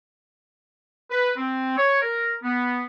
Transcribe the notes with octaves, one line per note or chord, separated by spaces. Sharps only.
B4
C4
C#5
A#4
B3